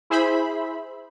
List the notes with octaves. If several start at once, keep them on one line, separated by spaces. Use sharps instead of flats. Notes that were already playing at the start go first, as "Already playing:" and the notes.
E4 G#4 C5 E5 B5